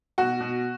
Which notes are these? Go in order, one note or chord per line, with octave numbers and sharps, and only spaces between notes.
B2 F#4
B2